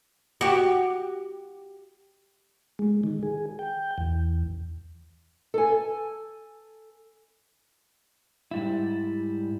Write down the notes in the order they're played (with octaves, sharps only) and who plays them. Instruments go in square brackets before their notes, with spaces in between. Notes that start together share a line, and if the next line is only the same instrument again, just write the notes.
[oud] F#4 G4
[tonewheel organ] G#3
D#3
G#4
G5
E2
[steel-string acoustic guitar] A4 G#5
[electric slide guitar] G#2 G3 E4